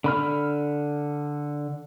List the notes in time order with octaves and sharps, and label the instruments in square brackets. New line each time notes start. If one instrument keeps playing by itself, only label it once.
[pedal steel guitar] D3 B5 F6